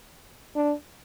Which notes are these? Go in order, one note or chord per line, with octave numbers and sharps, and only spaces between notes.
D4